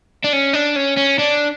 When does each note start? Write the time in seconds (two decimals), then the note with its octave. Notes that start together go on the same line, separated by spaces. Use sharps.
0.24 D4
0.33 C#4
0.54 D4
0.76 C#4
0.97 C#4
1.19 D4